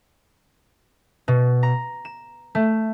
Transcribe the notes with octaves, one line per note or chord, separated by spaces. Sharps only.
B2
A#5
E7
A3